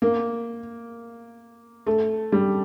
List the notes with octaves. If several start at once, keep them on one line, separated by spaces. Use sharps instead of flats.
A#3
A3
G3